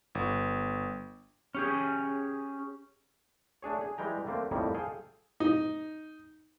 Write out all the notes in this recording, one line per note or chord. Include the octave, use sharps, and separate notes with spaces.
G1
C#4 G4 G#4
A3 D4 G#4 C#5
G#4
E3 G3 G#3 G5 A#5
D3 A3 A#3 C4
F2 A2 D#3 G3 A#3
G#4 A4 F5 G5
D#4